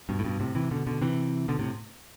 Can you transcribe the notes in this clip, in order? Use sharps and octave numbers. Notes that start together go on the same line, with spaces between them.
G2 B2
A2
G2 B2
A2 C3
C3 E3
B2 D3
B2 D3
C3 E3
B2 D3
A2 C3